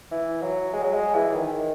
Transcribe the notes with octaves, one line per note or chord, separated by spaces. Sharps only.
E3
F#3
G#3
F#3
G#3
E3
D#3